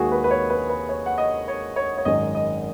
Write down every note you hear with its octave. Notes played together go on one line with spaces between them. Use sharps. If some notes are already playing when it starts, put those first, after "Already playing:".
Already playing: D#2 D#3 G#3 F#4 G#4
B4
B4
C#5
B4
B4
C#5
F#5
D#5
C#5
C#5
C#5
G#1 F#2 D#3 G#3 D#5
D#5